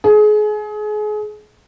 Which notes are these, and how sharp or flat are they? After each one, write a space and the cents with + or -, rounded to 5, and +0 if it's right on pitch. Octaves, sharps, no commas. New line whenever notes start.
G#4 +30